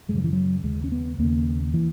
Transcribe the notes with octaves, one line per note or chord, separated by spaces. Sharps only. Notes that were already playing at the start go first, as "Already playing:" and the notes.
F#2 G#3
C#3 F#3
E3
F#3
D#2 C#3 G#3
C#4
B3
D#2 C#3 A#3
E3